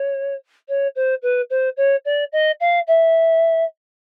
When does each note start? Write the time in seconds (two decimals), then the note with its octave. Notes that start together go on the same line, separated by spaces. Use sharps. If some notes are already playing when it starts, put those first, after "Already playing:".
Already playing: C#5
0.68 C#5
0.96 C5
1.22 B4
1.50 C5
1.77 C#5
2.05 D5
2.32 D#5
2.60 F5
2.87 E5